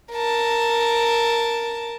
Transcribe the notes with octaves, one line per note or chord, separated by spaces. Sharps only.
A#4 A5